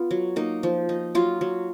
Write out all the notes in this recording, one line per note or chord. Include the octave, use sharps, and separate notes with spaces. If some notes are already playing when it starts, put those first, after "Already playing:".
Already playing: B3 F4
F#3
A#3 D#4
F3
D#4
F#3 F4
F#3